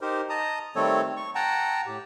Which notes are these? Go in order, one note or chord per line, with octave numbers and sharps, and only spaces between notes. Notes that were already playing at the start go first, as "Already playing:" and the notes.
D#4 G4 A#4 C5
D#5 A5 A#5 D#6
D#3 G3 A3 C4 A4 C#5
C#6
F#5 G5 A5 A#5
A2 G4